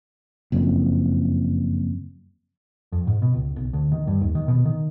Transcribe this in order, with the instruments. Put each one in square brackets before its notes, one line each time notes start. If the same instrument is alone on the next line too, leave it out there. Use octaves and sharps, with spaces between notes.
[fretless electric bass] F#1 F2
[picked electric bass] F2
G#2
B2
C#2
B1
D2
D#3
G2
D#2
D#3
B2
D#3